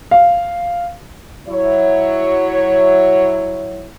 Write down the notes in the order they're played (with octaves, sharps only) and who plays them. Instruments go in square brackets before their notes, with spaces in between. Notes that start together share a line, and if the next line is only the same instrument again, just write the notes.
[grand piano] F5
[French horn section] F#3 E4 C#5